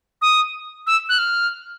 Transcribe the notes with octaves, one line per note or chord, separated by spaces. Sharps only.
D#6
E6
F#6
F6